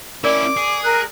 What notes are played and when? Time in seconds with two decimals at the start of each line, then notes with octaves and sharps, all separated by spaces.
0.24 C#4 E4 A#4 D5 D6
0.57 G#4
0.84 A#4 F#6